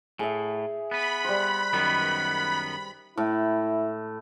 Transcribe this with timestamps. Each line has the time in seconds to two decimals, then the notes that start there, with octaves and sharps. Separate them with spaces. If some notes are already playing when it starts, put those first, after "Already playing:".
0.19 A2 G#4 E5
0.91 B3 B4 B5
1.24 G3 C5 F#6
1.73 F#2 D#3 B3 B4
3.17 A2 E4